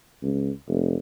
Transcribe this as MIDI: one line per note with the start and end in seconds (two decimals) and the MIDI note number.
0.22 0.50 37
0.68 0.95 29